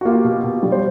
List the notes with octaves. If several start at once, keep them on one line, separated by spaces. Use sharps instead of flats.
F#4
A#3 F4 G4
B2
B2
G3
C5